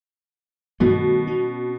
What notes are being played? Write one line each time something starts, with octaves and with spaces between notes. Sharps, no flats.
B2 D#3 G3 A3
C#4